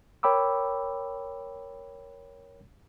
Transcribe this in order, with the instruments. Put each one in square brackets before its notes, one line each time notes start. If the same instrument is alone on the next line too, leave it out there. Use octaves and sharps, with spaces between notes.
[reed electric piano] A#4 C#5 G5 B5 D6 E6